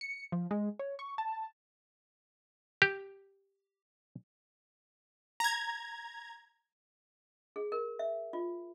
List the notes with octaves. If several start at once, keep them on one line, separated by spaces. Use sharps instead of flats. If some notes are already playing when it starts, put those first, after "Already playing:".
C#7
F3
G#3
C#5
C#6
A5
G4
A#5 G#6
G#4
A#4
E5
F4